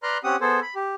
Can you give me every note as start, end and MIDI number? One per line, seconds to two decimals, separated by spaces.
0.03 0.18 71
0.03 0.18 74
0.03 0.18 82
0.03 0.18 84
0.03 0.18 89
0.03 0.18 90
0.24 0.36 60
0.24 0.36 61
0.24 0.36 67
0.24 0.36 78
0.24 0.36 87
0.41 0.60 59
0.41 0.60 68
0.41 0.60 69
0.41 0.60 72
0.62 0.74 83
0.75 0.95 67